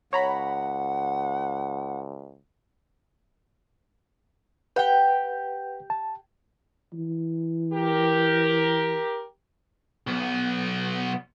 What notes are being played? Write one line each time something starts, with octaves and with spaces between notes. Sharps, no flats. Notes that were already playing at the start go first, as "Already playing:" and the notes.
C#2 C#5 F#5 A#5 B5
G4 B4 F#5 G5
A5
E3
G4 A#4
B1 B3